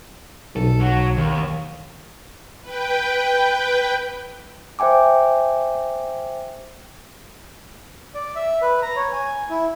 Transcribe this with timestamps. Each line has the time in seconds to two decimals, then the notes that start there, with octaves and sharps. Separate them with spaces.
0.56 B1 A4
0.80 F#3
1.17 D#2
2.62 B4 G5
4.79 C5 E5 G5 G#5 D6
8.15 D5
8.36 E5
8.62 B4
8.82 A#5
8.96 C#5
9.12 G#5
9.50 E4